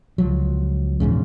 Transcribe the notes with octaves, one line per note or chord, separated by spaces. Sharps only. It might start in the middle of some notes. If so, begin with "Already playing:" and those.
C#2 F3 F#3
A#1 E2 G#2 C#3